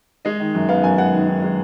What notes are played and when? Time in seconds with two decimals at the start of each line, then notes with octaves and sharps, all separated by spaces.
0.25 G#3 D#5
0.40 D#3
0.55 F#2
0.69 B3 F5
0.84 F#2 G#5
0.98 G#3 F#5
1.13 D#3
1.28 D#3
1.42 G#3